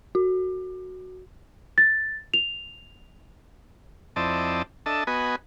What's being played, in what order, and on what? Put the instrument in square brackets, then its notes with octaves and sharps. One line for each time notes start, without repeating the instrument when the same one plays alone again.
[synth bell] F#4
[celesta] A6
F7
[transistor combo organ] F2 C4 E4 D5 D#5 A5
D4 A4 D#5 E5 A5
B3 F#4 B4 D#5 G#5